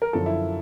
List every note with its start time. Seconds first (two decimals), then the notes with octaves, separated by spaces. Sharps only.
0.02 A#4
0.13 F#2 D3 F3 A4
0.26 E4